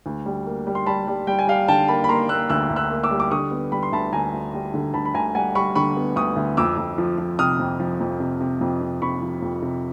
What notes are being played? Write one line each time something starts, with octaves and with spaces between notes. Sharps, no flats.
D2
G3
A#3
G3
C6
G3 A5 B5
G3
G3 G5
G#5
G3 F5 G5
D3 G5 A5
A#3 A5 B5
B5
A#3 A#5 C6
A#3 E6 F#6
D2 E6 F#6
D2
E6 F#6
A#3
D6 E6
G3
D6
D3 C#6 D#6
B3
G3 B5
C6
D2 A5 B5
D2 G#5 A#5
D2
G3
D3
D2 A5 B5
B5
D2 G#5 A#5
G3 F#5 G#5
G3 B5 C#6
D3 B5 C#6
B3
D2 C#6 D#6
D2
F2 D6 E6
F2
F3
F3
C3 D#6 F6
F2
F3
F2
C3
C3
F2
C3
C3 B5 C#6
F3
F2
C3